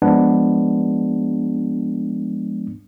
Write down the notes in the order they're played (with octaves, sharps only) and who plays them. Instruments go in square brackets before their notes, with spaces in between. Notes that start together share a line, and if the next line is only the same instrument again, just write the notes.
[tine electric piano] F3 G#3 B3 D4